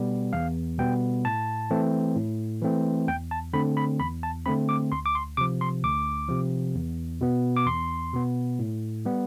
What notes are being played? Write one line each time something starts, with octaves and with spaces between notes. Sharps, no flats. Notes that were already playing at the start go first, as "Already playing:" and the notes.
Already playing: B2 G3 B3
E2 F5
B2 G3 B3 G5
A2 A5
E3 A3 C4
A2
E3 A3 C4
E2 G5
A5
D3 A3 C4 B5
B5
E2 B5
A5
D3 A3 C4 B5
D6
D2 C6
D6
C6
C3 F3 D6
C6
D2 D6
C3 F3
E2
B2 B3
D6
E2 C6
B2 B3
A2
G3 B3